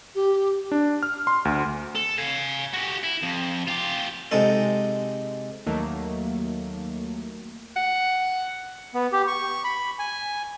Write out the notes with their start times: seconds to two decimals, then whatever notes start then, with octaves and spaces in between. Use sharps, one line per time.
0.15 G4
0.72 D4
1.03 F6
1.27 C6
1.45 D2
1.96 A4
2.18 F5 G#5
2.74 F#4 G4
3.03 E4
3.22 F2
3.68 F4 G4
4.31 C3 G#3 D#4 A4
5.66 D#2 D#3 F#3 A3 A#3
7.76 F#5
8.94 B3
9.12 G4
9.27 C#6
9.64 B5
9.99 G#5